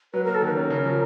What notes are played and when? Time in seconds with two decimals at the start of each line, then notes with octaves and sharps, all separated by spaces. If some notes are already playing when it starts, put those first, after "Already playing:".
0.14 F#3 B4
0.24 A#3 A#4
0.35 A4
0.42 D#3 B4
0.50 A#4
0.57 C#4
0.70 C#3
0.85 F3